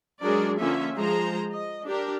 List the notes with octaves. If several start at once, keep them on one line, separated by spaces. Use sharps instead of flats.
F#3 G#3 D4 G#4 A#4 D5
D3 F3 A#3 C#4 F4 E5
F3 G#3 G#4 C5 A#5
D#5
D4 G4 A#4